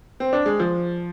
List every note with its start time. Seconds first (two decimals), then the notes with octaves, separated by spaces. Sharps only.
0.20 C4
0.33 D4
0.46 G#3
0.59 F3